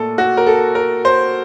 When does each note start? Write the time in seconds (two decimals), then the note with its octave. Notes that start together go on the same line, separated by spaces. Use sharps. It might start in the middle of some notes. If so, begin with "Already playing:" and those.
Already playing: A#2 A3 A4
0.18 F#4
0.37 A#4
0.47 A4
0.75 A#4
1.05 C5